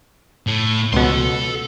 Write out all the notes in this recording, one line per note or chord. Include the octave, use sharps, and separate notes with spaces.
A2
C#2 B2 A4 C6